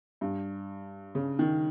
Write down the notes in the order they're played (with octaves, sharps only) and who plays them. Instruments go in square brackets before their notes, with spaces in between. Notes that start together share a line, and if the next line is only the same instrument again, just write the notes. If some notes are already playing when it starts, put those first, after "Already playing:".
[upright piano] G2
C#3
D#3